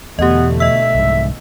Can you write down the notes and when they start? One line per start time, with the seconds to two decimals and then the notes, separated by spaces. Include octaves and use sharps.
0.19 E2 B2 D3 A3 B3 G4 D#5
0.60 D#5 E5 E6
0.95 C2 G#2